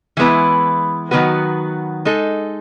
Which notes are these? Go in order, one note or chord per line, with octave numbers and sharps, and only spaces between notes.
E3 G#3 B3 E4 B4
D#3 F#3 B3 F#4 B4
G#3 D#4 A4